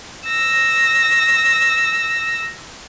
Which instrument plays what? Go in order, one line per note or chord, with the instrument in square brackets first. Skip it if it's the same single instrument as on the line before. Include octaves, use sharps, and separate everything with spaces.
[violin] E6 A#6